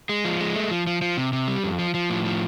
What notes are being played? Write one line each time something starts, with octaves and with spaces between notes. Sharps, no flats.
G#3
F3
G#3
A3
F3
F3
F3
C3
C3
G3
F2
F3
F3
A2
F3